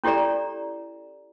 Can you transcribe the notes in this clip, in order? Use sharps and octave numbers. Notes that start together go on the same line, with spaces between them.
C#4 E4 G4 A4 D5 A#5